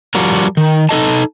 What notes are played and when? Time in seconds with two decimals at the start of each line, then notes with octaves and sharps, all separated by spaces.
0.15 F3 G3 F#4 A#4
0.57 D#3
0.89 D#4 A4 D#5 A5